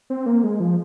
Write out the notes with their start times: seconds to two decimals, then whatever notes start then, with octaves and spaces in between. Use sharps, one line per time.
0.10 C4
0.26 A#3
0.44 G#3
0.60 F3